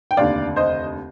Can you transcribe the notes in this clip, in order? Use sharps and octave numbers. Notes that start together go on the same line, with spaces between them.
G5
F1 D#2 D3 D5 F5
C5 D#5